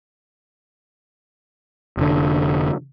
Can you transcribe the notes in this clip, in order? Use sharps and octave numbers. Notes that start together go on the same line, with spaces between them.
F1 D3